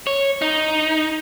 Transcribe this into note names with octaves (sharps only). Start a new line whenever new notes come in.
C#5
D#4